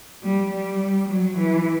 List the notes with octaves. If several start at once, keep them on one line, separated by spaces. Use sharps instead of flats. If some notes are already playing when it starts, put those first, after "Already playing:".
G3
G3
F#3
E3